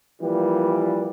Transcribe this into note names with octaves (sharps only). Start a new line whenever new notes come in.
E3 F3 G3 A#3